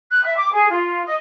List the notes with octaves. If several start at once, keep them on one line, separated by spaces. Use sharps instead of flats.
F#6
E5
D6
G#4
F4
D#5